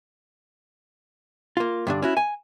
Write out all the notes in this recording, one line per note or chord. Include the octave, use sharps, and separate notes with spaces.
A#3 F4
G2 D3 D4
C#4 E4 F#4
G#5